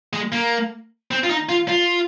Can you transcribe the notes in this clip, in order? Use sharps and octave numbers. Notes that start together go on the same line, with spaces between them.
G#3
A#3
C4
F4
D#4
F4
F4